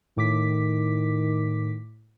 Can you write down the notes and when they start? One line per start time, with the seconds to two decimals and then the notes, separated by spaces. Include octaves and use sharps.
0.17 A2 D#3 D6 B6